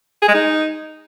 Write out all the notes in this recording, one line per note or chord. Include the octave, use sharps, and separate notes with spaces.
G#4
G#3
D#4